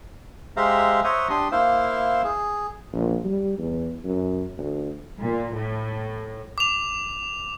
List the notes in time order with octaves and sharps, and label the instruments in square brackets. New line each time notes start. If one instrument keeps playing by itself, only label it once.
[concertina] G#3 G4 C5 E5 F5 A#5
C5 C#5 E5 F#5 A#5 D#6
D4 G4 C6 D#6
A#3 E4 C5 F5 E6
G#4
[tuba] A#1
G3
E2
F#2
D2
[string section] A#2
A2
[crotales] D6 F7